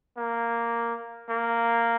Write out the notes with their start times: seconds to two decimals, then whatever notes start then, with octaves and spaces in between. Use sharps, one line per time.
0.17 A#3
1.29 A#3